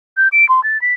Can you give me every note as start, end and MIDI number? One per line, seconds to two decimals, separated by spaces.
0.17 0.28 91
0.32 0.47 98
0.49 0.63 84
0.64 0.80 93
0.81 0.94 95